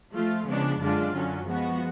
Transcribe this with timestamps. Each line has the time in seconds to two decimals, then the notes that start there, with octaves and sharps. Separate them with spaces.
0.12 F3 A3 F4
0.46 C#3 F3 G#3 B3 D4
0.79 F#2 D3 G#3 D4 F4
1.13 F#2 D3 F#3 C#4
1.47 F3 G#3 B3 F#4